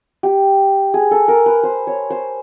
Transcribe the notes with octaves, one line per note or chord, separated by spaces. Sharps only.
G4
G#4
A4
A#4
B4
C5
C#5
C5